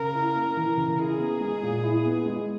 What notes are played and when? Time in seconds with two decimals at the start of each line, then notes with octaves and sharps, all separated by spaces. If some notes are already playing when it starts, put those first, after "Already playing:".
Already playing: C#3 A#4
0.14 E4
0.35 A#3
0.57 E3
0.77 C#3
0.99 E4 G#4
1.20 B3
1.41 G#3
1.63 A#2
1.83 E4
2.05 B3
2.26 G#3